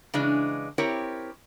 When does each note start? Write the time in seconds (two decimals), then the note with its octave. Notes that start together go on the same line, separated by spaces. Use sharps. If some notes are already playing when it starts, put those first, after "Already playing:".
0.14 C#3 E3 G#3 D4
0.78 C4 E4 G4 A#4 C#5